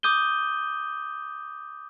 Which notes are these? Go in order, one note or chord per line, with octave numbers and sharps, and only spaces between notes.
D6 D#6 G6 D#7 G7